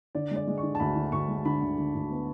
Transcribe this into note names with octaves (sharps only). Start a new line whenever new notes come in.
D3 D5
G#3 D5
G#3
C#6
D3
A5
D2 B5
D3
D2 C#6
G#3
D3 B5
D2
D3
D2
B3